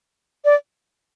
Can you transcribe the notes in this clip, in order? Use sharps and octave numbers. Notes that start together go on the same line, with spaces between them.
D5